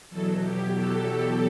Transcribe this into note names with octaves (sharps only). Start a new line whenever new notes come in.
E2 B2 F#3 A4
G4
A4
G4